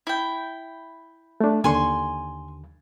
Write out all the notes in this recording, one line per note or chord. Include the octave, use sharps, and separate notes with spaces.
E4 G5
A3 D4
D#2 D3 G#5 C6 C#6